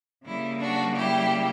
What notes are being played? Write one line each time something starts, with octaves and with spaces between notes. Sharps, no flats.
C#3 G3 A#3 E4
D4 F#4
E4 G4